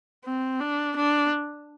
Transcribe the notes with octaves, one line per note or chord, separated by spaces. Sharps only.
C4
D4
D4